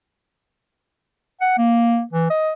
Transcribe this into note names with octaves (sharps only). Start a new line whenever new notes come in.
F#5
A#3
E3
D#5